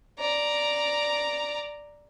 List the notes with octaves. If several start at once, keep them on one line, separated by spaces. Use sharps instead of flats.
D5 A#5